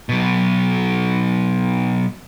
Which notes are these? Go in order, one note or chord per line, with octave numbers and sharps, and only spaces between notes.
B2 F#3